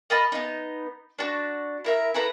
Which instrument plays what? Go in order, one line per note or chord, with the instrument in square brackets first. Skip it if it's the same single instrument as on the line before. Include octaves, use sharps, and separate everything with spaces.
[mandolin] A#4 D#5 A5 B5
B3 D#4
D4 F#4
E4 A#4 E5
E4 A4 B4 A#5